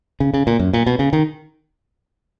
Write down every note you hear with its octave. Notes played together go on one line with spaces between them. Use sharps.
C#3
C#3
A#2
F#2
A#2
B2
C#3
D#3